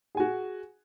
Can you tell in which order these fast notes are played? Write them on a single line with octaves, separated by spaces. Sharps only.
G#4 G#5 F#4